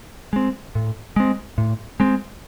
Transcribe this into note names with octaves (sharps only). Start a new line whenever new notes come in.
G#3 C4
A2
G#3 C4
A2
G#3 C4